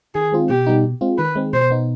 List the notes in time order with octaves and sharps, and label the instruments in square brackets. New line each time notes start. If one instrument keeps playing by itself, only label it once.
[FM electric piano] D#3 [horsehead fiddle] G#4
[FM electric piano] G#3 C4 F4
[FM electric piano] B2 [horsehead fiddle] G4
[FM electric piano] G3 B3 D#4
B2
G#3 C4 F4
[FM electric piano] D#3 [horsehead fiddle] B4
[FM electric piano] G#3 C4
[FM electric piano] B2 [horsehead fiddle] C5
[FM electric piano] B3 D#4